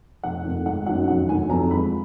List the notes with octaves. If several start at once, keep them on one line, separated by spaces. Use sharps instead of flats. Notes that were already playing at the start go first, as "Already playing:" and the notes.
F1 F#5
F2 D#3
G#1 F#5
F#2 D#3 F#3 F#5
F1 F#5
D#2 D3 F#3 G#5
F2 A#5
F3 G#3 B5